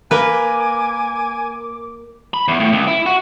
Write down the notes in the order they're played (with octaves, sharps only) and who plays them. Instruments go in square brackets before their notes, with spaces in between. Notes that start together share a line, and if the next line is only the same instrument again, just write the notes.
[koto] A#3 B4 [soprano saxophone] G#5 [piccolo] D6
[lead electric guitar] B5
E2
A2
C#2
E4
F#4